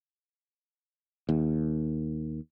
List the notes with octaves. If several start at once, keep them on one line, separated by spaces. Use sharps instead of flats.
D#2